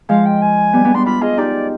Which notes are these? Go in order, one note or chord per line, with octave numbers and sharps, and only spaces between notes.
F3 G#3 F5
G5
G#5
G3 B3
B3 D4
B3 D4 C6
D4 F4 B5
F4 G#4 D#5
D#4 G4 D5